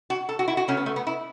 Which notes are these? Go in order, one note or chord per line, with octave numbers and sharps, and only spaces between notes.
F#4
A4
F#4
E4
F#4
C#3 A3 C#4
B3
A3
B3
E4